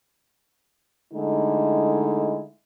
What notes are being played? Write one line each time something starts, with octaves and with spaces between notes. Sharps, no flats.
D3 G#3 A3 D#4 E4